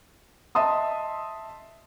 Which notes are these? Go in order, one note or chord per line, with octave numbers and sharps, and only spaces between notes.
D#5 E5 A5 C6 D#6